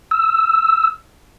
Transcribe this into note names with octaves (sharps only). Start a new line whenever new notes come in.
E6